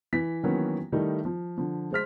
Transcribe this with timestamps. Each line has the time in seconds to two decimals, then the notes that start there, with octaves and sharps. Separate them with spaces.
0.13 E3 B6
0.44 D#3 E3 F#3 A#3 B3 C#4
0.92 D#3 G3 A3 D#4 E4
1.25 F3
1.58 D3 F3
1.91 G#3 C5 F6 B6